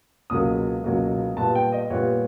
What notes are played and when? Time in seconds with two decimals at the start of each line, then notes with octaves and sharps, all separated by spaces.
0.30 C#2 B2 F#3 A#3 D#6
0.84 C#2 B2 F#3 A#3
1.37 A#2 G3 B3 A5
1.55 G5
1.72 D#5
1.90 A#2 G3 B3 C#5